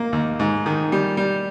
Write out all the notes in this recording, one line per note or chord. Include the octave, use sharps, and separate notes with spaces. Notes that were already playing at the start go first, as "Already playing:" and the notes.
Already playing: A#3
D#2
G#2
D#3
G3
G3